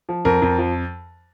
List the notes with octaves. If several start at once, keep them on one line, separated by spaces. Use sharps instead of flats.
F3
F2 A#4
F2
F3